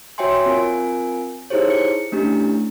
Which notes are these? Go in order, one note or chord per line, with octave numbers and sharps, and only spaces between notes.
F#4 C#5 E5 G5 G#5 C6
C4 F4 A#4 G#5
D#4 E4 G4 G#4 C5 C#5
C#7
A3 C#4 D4 E4 G4